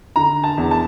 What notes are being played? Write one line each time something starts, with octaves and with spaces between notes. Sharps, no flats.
D3 A#5
A5
E2
A5